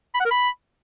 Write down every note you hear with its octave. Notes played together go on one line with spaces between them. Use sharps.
B5
F#5
A#4
B5